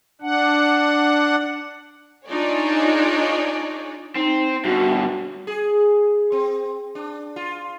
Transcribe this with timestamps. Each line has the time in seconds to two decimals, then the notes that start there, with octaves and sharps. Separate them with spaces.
0.21 D4 F#5
2.27 D4 D#4 F4 G#4 C#5 D5
4.15 C4 D#4
4.65 G2 B2 F#4
5.47 G#4
6.32 C4
6.95 D4
7.36 F4